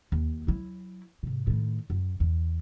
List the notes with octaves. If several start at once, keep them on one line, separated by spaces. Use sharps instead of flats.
D#2
F#3 E4
G#2 C3
A2 D#3
F#2
E2